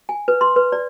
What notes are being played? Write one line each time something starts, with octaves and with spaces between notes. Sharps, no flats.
G#5
B4
C6
B4
D5